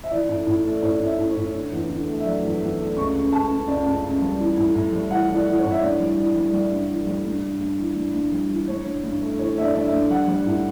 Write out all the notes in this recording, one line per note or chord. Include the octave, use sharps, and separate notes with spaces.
E5
E3 D5
A2
A2
A3
A2 C#5
A2
E5
A2
C#5
A2
D3
E2
D3
A3
E5
F#3 D5
E2
E2
A3
C#2 C#6
C#3
C#2 A5
C#3
C#2 D5
C#2
C#2
G3
E3
A2
A2
G3
E3 F#5
E3
D5
E3
C#5
A2
E5
G2 D5
G3
E3
G3
G3
G2
E3
G3
G2
G2
G2
E3
G2
G2
G3
E3
G2 C#5
G2
G2
A3
E3 C#5
G2 E5
D5
G2 D5
E5
G2
G3 F#5
G3
A2